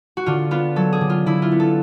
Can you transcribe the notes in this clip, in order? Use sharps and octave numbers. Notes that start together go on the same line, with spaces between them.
F#4
D3 F4
B3 F4
F#3 A4
G#4
D3
F4
D3 E4
F4
B3
A4